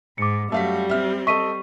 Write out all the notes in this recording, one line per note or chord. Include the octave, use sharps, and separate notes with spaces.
G#2 D6 C#7
F#2 G3 A3 F#4 F5 B6
C4 E5 F6
A4 D#5 C#6 B6 D#7